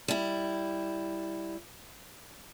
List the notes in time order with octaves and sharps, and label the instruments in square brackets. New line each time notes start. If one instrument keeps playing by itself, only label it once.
[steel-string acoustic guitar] G3 E4